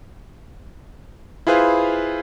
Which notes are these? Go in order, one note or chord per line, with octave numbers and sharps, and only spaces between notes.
E4 F4 G#4 B4 C5 F5